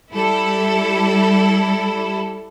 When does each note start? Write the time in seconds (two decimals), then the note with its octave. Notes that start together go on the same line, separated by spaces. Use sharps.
0.13 G3 E4 A4